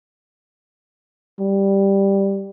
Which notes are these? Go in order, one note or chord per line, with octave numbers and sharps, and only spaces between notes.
G3